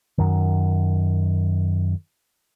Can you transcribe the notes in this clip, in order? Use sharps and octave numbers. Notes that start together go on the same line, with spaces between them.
F#2 D#3